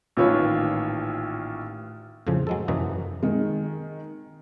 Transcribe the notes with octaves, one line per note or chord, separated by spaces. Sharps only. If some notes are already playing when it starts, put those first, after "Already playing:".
A1 A#2 D#3 F4 B4 C#5
F2 A2 C#3 F3
F#3 G#3 A4
F#2 C3 E3 F#3 A#3 D#5
D#3 G#3